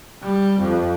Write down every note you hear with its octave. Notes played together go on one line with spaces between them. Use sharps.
G3
F2